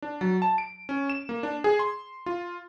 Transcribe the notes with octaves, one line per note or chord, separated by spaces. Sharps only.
D4
F#3
A5
D7
C#4
E7
A#3
D4
G#4
C6
F4